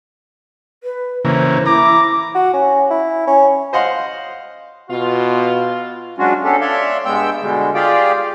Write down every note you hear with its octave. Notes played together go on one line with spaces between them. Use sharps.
B4
C#3 E3 A#3 C5
E4 A#5 D6
F#4
C#4
E4
C#4
C5 D#5 F5 F#5 C6
B2 F4
F#3 G#3 C#4 D4 F4 F#4
B3 C#4 D4 G4 A4
C#5 D5 E5 F5 C6
G2 G#3 B3 G5 E6 G6
B2 D3 G3 G#3
F4 G4 G#4 D5 F5 G5